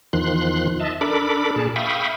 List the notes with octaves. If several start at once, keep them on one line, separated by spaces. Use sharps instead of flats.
E2 D#3 F3 C6 F#6
D#5 E5 A5
D4 A4 A#4 B5 D6
A#2 G#4 A5
E5 F5 G5 B5 C#6 D#6